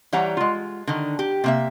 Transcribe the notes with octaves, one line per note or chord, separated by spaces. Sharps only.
E3 G3 C#5 F#5 A#5
G#3 F4
D3 D#3
G4
C3 A#3 E5